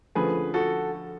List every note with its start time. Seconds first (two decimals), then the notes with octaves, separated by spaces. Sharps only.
0.15 D3 F3 A3 C#4 G#4 B4
0.54 F#4 A4